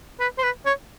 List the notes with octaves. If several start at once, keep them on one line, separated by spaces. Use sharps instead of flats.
B4
C5
B4
C#5